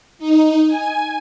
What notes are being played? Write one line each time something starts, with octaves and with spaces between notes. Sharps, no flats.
D#4
G#5